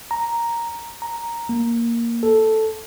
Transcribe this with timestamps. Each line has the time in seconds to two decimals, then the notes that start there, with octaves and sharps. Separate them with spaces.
0.11 A#5
1.02 A#5
1.49 A#3
2.23 A4